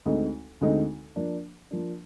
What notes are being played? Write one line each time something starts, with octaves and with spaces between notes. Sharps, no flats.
D2 D3 G#3 C4 D#4
D2 D3 G#3 C4 D#4
F3 A#3 D4
F3 A#3 D4